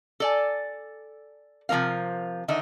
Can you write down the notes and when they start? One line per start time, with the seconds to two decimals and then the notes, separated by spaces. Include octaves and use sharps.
0.20 A4 D5 G#5
1.69 C3 F3 A#3 A#4 F5
2.48 D3 D#3 D#4 E5